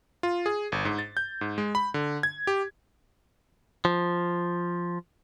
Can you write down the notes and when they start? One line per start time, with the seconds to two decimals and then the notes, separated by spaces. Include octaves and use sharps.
0.23 F4
0.46 G#4
0.72 G1
0.85 G#2
0.98 A6
1.17 G6
1.41 G#2
1.58 G#3
1.75 B5
1.94 D3
2.23 G#6
2.47 G4
3.85 F3